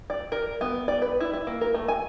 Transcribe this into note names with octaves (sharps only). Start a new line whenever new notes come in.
D5
A#4
B3
D5
B4
E4
E4
A#3
A#4
A3
G#5